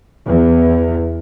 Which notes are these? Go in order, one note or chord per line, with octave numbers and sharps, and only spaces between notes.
E2